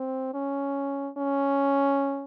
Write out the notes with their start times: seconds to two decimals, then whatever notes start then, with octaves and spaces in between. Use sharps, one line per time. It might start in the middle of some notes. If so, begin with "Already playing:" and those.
Already playing: C4
0.34 C#4
1.18 C#4